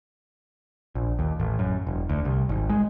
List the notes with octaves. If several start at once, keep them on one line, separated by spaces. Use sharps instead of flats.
A#1
D#2
A1
F#2
E1
D2
C2
G#1
G#3